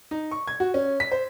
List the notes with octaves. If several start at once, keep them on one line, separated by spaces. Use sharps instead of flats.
D#4
C#6
G#6
F#4
C#4
B6
C5